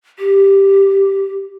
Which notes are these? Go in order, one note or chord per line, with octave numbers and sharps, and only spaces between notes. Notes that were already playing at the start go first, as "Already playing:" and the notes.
G4